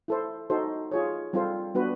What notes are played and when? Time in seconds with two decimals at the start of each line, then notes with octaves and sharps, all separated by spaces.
0.08 E4 A4 C5
0.50 D#4 F#4 A4 C5
0.91 F4 G#4 C#5
1.33 G3 C4 F4 A4 C5
1.75 G3 B3 D4 F#4 B4